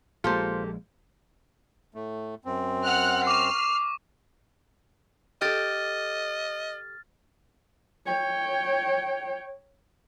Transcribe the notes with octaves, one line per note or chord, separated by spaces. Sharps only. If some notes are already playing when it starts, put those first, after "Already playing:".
A#1 G#3 A#3 F4 G4 A4 C5
A2 A3
F#2 C4
F#5 F6 F#6
C#6 D6 F6 C7
G4 A4 D#5 F6 A6
C#5 G5